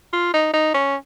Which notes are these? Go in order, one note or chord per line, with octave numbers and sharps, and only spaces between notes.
F4
D#4
D#4
C#4